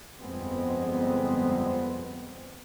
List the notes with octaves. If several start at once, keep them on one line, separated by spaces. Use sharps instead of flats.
G1 F2 G#3 B3 C4